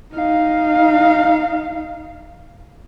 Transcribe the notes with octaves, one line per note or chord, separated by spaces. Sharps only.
D#4 F5